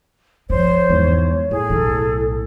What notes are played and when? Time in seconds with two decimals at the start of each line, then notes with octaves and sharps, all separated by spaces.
0.50 F3 C5 C#5
0.89 E2 G#2
1.51 A2 G#4
1.70 B1 A4